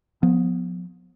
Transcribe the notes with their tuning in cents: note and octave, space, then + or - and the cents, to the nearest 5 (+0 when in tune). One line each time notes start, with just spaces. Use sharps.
F3 +35 B3 +0